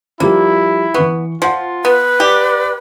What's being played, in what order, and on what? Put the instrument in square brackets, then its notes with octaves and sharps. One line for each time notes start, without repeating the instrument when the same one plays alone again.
[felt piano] F3 G3 [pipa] A#3 [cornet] E4
[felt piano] E3 C#6 [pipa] B3
[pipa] F3 [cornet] F4 [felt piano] F#5 C6
[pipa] B3 [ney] B4
[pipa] G4 [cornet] D5